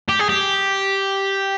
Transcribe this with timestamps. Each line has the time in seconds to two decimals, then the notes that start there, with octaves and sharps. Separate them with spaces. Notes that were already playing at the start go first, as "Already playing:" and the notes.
0.09 G4
0.19 G#4
0.29 G4